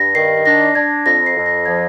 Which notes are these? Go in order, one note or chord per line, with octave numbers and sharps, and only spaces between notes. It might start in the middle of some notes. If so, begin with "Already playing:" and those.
Already playing: G2 A#6
D#3 C7
D4 A#6
D4 G#6
F2 A#6
C7
F2
A#6
F3 G#6